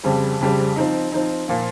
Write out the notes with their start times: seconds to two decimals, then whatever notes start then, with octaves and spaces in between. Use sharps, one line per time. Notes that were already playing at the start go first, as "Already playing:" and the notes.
0.03 F2 C#3 G3 C4
0.40 F2 C#3 G3 C4
0.76 F3 C4 D#4
1.12 F3 C4 D#4
1.48 A#2 F3 A#3